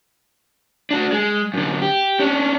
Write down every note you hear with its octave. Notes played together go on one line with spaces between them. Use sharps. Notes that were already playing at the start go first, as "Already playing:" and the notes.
D4 F#4
G#3
F#2 D3
G4
C#4 D4